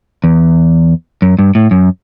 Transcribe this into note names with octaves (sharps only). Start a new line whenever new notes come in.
E2
F#2
G2
A2
F#2